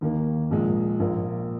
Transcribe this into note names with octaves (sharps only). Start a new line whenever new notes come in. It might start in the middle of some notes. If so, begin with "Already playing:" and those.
D#2 D#3 A#3
A#1 A#2 G#3
A#1 A#2 A#3